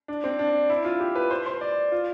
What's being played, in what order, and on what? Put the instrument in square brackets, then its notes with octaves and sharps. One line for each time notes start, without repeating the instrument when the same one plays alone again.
[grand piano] D4
C4
D4
E4
F4
G4
B4
C5
C5
D5
F4